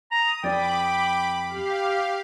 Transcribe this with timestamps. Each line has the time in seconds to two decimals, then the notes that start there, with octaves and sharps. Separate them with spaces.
0.12 A#5 D#6
0.44 F2 D5 G5 B5 D6
1.49 G4 F5